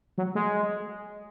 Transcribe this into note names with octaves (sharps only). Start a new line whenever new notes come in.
F#3
G#3